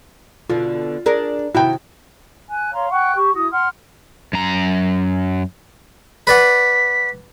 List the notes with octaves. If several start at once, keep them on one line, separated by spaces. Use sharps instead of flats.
B2 D3 F4
D4 G#4 A#4
C3 D#3 E4 F#4 G5
G#5 F#6
C#5 F5 A#5 C6
F#5 G5 C#6 F#6
G4 C#6
E4 F#4 D#6
F#5 C6 F6
F#2 A#5
B4 D5 F#5 B6